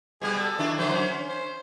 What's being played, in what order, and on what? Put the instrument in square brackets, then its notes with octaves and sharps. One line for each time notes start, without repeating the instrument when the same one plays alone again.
[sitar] B2 G3 B3 [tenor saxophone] G#4
[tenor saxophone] A4
[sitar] D#3 D4 E4
[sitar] D3 E3 F#3 [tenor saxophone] C5
[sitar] C#4
[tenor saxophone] C5